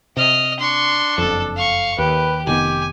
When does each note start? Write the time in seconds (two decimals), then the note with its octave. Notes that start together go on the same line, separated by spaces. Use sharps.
0.17 C3 D#5 F6
0.59 D4 C6 C#6
1.18 F#1 F2 A4
1.56 F5 C#6
1.98 D#2 G4 B4
2.47 F1 D#3 B3 G4 G#5